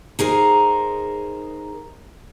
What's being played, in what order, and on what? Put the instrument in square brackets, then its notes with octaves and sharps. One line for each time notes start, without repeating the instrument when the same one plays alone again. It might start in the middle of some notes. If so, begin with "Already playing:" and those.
[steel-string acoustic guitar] D#4 G#4 A#4 C5